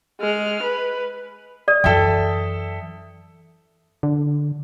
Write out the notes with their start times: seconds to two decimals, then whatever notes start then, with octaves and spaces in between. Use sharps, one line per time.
0.20 G#3 F6
0.63 B4
1.68 D5 D#6
1.84 F#2 E3 A4 E5 G5
4.03 D3